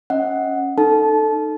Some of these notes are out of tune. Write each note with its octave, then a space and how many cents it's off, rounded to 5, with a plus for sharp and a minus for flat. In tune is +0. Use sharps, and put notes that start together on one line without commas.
C#4 +0 D#5 +35 F#5 +0
D#4 -20 A4 +0 A5 -25